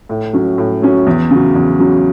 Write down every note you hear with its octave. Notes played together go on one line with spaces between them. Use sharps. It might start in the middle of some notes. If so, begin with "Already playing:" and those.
A2
F#3 C#4
A2
F#3 C#4
E2
C#3 F#3
E2
C#3 F#3